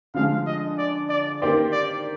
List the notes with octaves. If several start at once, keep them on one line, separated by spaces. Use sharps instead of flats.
D3 F3 G#3 F5
D#5
D5
D5
D#3 A#3 D#4 G4 C5 D5
D5